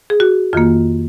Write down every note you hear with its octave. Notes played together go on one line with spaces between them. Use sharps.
G#4
F#4
F2 D#3 A#3 F4